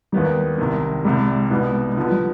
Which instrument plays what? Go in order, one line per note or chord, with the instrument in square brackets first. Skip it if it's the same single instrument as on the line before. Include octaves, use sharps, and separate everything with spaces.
[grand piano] D#2 D#3 B3 D#4 [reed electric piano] G3
[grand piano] C2 C3 D#3
[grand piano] C2 C3 G3 [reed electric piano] G#3
[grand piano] C2 B2 G3 B3 D#4
D3 F3 B3 D#4
[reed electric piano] G3